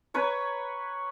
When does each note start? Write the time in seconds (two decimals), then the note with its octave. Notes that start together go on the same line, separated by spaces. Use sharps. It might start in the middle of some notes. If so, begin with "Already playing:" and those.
0.14 B4 C#5 A#5